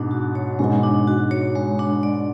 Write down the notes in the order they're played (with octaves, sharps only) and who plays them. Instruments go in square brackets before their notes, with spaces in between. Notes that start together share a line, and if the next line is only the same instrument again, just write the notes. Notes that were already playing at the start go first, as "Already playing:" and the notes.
Already playing: [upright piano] G#2 B2 [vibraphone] D4
[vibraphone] F#4
C#5
[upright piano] G#2 B2 [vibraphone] G#3
[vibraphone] D4
F#4
C#5
G#3
D4
D5